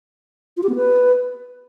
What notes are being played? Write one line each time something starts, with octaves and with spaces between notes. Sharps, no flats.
F4
G4
B3
B4